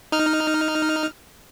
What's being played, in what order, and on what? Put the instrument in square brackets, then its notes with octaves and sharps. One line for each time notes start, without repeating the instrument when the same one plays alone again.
[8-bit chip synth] D#4 F6